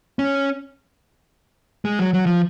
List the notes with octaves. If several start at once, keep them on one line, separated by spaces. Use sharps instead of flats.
C#4
G#3
F#3
F#3
F3